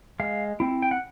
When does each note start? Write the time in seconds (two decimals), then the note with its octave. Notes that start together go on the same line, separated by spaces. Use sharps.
0.20 G#3 F5
0.60 C4 E4
0.82 G5
0.91 F#5